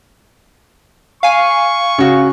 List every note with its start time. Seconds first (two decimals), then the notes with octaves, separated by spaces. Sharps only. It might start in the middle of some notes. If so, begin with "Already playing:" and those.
1.23 F5 G#5 C#6
1.98 C#3 F#4